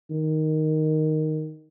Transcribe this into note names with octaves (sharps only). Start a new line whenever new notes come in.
D#3